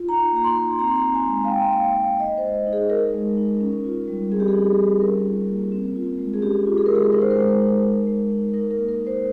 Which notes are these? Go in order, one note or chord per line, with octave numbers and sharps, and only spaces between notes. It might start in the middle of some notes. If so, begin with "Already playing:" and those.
Already playing: F4
D#4 A#5
A#3 A#5
C6
D#4
C4 A#5
C6
A#5
D#4
G#5
G#3
F5
D#4 G5
A#3 F5
D#4 F5
D#4 D#5
C5
G#3
D#4
G#4
D#4 A#4
G#3
D#4
C#4
F4
G3
C4 G#4
G4
G#4
D#4
G3
C#4 A#4
F4
A#3
C4
F4
G#3
G#4
C#4 G4
F4
G#4
G#3 A#4
G#4
D#4 A#4
C5
A#4
G#3
D#4
D#4
G#3
D#4
D#4 A#4
A#4
A#3
A#4
D#4
C5